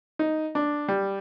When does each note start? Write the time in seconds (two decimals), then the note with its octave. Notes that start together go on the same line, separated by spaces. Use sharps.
0.19 D#4
0.55 D4
0.89 G3